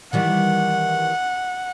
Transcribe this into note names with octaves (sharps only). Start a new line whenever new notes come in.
D#3 E3 G3 F#5